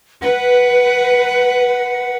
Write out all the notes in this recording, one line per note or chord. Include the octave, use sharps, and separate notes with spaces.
B4 F#5